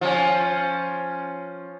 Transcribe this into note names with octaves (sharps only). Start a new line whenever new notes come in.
F3 C#4